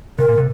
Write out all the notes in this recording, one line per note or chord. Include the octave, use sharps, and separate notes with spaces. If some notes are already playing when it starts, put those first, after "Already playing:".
C3 A#4
A#2
C3